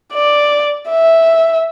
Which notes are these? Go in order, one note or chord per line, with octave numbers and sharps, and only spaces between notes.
D5
E5